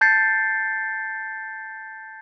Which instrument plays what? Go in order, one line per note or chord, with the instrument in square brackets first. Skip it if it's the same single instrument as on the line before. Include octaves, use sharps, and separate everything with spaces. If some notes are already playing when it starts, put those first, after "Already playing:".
[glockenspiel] A5 G6 A6 C7 C#7